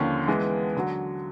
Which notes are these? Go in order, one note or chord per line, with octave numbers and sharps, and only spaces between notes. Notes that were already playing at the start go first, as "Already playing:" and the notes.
Already playing: D#2 D3 F3 A#3 C#4
E3 G#3 B3
D3 F#3